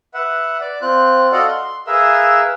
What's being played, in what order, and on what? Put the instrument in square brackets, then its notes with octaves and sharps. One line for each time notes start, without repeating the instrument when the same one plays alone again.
[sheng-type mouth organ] B4 E5 F#5
D5
C4 F4 F#6
F#4 A4 D5 D#5 F5 F#5
C6
G#4 A#4 B4 E5 F5 E6